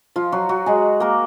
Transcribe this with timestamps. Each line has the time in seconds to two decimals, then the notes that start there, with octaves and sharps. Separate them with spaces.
0.16 F3 F4
0.32 F#3 F#4
0.49 F#3 F#4
0.66 G#3 G#4
1.00 A#3 A#4